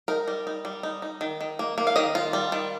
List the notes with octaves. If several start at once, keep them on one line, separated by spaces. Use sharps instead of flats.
D#4 A#4
G3
D#4
G3
D#4
D#4
D#3
D#3
A#3
A#3
F5
D#3 D#5
F4
G3
D#3